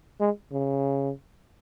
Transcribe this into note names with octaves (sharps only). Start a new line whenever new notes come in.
G#3
C#3